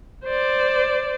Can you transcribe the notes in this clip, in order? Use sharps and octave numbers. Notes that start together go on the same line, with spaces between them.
C5 D5